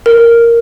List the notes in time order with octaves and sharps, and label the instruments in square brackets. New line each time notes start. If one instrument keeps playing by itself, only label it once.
[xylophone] A#4